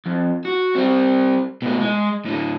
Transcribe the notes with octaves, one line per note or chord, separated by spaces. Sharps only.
F2
F#4
G3 C4
B2 A3
G#3
A2 D3